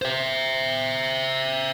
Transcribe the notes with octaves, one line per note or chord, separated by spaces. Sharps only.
C5 E5